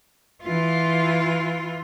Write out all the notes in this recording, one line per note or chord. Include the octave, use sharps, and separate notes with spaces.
E3 F4